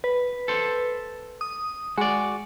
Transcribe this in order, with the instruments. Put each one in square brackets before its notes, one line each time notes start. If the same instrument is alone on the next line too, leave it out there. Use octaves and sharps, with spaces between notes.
[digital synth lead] B4
[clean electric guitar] A4 C5
[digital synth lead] D#6
[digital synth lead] G#3 [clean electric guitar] F#4 D5